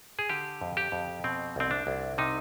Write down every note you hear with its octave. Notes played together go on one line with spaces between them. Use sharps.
G#4
D3 G4
F2
G4
F2
B2 C4
C2 C4
D4
C2
C3 D#4